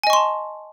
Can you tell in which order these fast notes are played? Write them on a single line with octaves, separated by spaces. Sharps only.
G#5 D#5 C#6 C6 A5